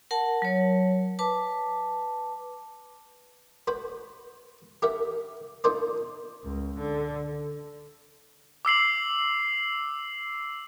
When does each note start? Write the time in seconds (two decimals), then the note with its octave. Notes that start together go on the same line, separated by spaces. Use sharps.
0.11 A#4 F#5 A5
0.42 F#3 C#5
1.19 B4 A5 D6
3.67 F#4 B4 C5
4.82 G4 A#4 E5 F#5
5.64 D#4 F4 A#4 C5 D5
6.44 C#2
6.79 D3
8.65 D6 E6 C7 F#7